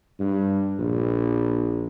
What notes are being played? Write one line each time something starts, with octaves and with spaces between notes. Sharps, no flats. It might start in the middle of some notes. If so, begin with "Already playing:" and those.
G2
A#1